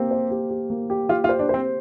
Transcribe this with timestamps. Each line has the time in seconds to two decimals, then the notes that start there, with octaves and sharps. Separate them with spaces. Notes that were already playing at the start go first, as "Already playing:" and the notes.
Already playing: A#3 C4 G4 C5
0.11 C5
0.31 G4
0.50 G4
0.70 A#3
0.90 G4
1.09 F4 G4
1.24 F4
1.29 C5
1.39 D4
1.49 C4 C5